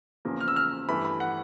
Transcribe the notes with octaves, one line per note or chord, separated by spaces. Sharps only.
E2 C#3 F3 A#3
F6
E6
F6
G2 E3 A3 B5
B5
F#5